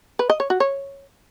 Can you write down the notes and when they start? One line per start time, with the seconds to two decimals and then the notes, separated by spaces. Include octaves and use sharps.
0.19 B4
0.30 D#5
0.40 C#5
0.50 F#4
0.60 C#5